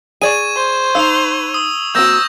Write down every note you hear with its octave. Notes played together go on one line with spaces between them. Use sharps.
G#4 D5 C#6 G#6 D#7
C5
D#4 F5 E6 F7
D#6
A#3 C4 F#4 E6 G6 A#6